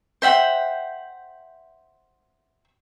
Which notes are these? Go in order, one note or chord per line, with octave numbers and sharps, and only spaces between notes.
C5 E5 F#5 G5